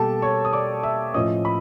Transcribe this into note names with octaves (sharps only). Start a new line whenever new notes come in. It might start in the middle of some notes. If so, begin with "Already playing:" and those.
Already playing: B2 G3 A#3 G4 A4 A5
C#5 C#6
D#6
D5 D6
E5 E6
A2 F3 A3 C#4 D#5 D#6
B5